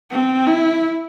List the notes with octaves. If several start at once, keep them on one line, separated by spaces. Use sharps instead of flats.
C4
E4